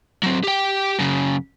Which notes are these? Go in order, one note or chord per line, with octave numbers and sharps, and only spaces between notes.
F#3 C4
G4 G5
F#2 C#3